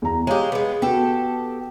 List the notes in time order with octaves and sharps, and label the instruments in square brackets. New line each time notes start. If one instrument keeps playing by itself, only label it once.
[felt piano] E2 A#5
[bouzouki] G#3 G4 [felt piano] C#5 F5
[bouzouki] G#3 B3
[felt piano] B3 F#4 [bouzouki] G4 A4